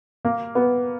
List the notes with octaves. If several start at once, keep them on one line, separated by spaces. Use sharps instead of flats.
A#3
B3